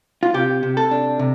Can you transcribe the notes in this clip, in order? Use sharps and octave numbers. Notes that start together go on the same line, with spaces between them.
F4
C3 G4
C3
A4
D4
C3